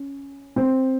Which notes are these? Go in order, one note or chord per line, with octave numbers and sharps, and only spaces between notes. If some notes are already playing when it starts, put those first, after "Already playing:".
Already playing: C#4
C4